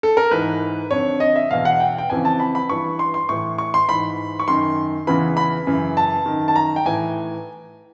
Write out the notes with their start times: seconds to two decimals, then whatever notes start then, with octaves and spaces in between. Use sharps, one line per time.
0.03 A4
0.17 A#4
0.31 G#2 E3 B4
0.91 F2 D3 C#5
1.20 D#5
1.36 E5
1.51 E2 B2 F5
1.65 F#5
1.80 G5
1.98 G5
2.10 F2 C#3 E3 G#5
2.25 A5
2.40 B5
2.55 B5
2.69 G2 E3 C#6
2.99 C6
3.14 C6
3.29 A2 E3 C#6
3.58 C#6
3.74 C6
3.88 G#2 E3 B5
4.40 C#6
4.48 F#2 D#3 C6
5.07 E2 C#3 E3 B5
5.37 B5
5.67 F#2 C#3 E3
5.97 A5
6.26 F#2 D#3
6.48 A5
6.56 A#5
6.76 G5
6.85 A2 E3 G#5